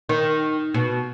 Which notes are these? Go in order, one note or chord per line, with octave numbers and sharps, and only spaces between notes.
D#3
B2